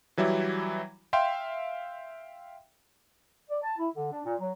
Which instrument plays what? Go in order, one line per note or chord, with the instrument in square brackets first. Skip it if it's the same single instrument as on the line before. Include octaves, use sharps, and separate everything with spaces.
[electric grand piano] E3 F#3 G3 E4
E5 F5 G5 C6
[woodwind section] D5
A5
E4
D3
D4
A#2
F#3